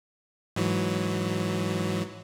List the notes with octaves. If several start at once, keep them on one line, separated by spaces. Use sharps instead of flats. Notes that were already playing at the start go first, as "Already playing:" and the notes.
G#2 E3 F#3